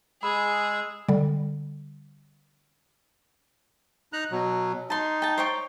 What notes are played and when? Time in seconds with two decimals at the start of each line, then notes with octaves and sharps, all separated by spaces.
0.23 G#3 G#4 B5 E6
1.09 D3 G3
4.13 D#4 A#5 F#6
4.31 B2 F#3
4.90 D#4 A5 C6
5.22 G5 A5
5.38 C5 C#5 G5